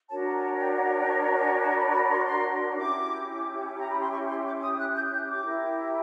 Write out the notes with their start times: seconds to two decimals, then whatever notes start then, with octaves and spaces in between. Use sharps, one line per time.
0.09 D4 F#4 A#4 C#5 A5
0.26 A#5
0.34 G#5
0.42 A5
0.60 G5
0.76 F#5
0.99 G5
1.42 G#5
1.60 A5
1.71 A#5
1.77 B5
1.93 B5
2.11 C6
2.18 C#6
2.25 C6
2.77 C#4 E4 G4 D6
3.76 A#5
3.89 B5
4.00 C6
4.11 C#6
4.28 C6
4.45 D6
4.61 D#6
4.78 F#6
4.95 G6
5.12 G6
5.28 D6
5.45 E4 G4 A#4